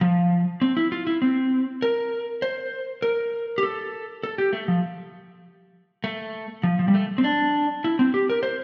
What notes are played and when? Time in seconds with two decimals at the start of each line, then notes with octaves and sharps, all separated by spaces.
0.01 F3
0.62 C4
0.77 E4
0.92 F4
1.07 E4
1.22 C4
1.82 A#4
2.42 C5
3.02 A#4
3.58 G4
3.63 A4
4.24 A4
4.38 G4
4.53 A3
4.68 F3
6.04 A3
6.63 F3
6.79 F3
6.88 G3
6.94 A3
7.18 C4
7.24 D4
7.84 E4
7.99 C4
8.14 G4
8.30 A#4
8.43 C5